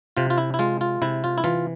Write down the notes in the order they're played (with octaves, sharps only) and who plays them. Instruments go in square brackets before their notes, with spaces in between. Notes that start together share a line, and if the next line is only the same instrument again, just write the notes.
[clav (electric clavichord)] C3 F4
F4
E4
E4
G#3 F4
F4
C3 E4
F4
E4
E3 F4